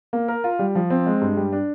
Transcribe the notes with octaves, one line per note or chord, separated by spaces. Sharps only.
A#3
A#4
F4
G3
F3
C4
G#3
G2
G3
D4